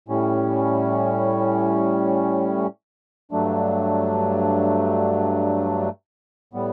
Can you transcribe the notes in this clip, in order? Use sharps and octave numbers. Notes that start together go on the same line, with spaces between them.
A2 G3 C#4
G2 F#3 A3 D4
A2 G3 B3